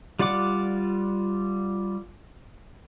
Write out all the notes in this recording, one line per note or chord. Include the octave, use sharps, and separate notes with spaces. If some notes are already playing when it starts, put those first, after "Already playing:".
G3 F4 D5 F#5 D6